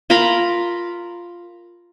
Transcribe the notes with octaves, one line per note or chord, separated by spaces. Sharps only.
F4 A#4 A#5 B5